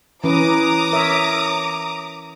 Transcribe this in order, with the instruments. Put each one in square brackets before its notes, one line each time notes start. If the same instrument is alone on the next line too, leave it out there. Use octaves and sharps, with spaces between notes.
[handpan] E3 C#4 B4 [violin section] A#5 D6 D#6
[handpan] A#4 C#5 E5